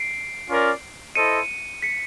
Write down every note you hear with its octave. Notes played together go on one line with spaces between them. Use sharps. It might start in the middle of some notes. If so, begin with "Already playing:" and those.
Already playing: C7 D7
C#4 F4 A#4 D5
E4 A4 C5 D#5 C#7 D#7
B6 C#7